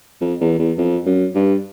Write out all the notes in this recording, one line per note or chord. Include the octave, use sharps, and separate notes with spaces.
F2
E2
E2
F2
F#2
G2